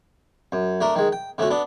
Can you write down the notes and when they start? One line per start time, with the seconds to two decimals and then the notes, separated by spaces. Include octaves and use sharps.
0.52 F#2
0.81 A3 D4 A#4
0.96 D#3 G#3
1.12 G5
1.38 D3 A3 C#4 F#4
1.50 B3 D4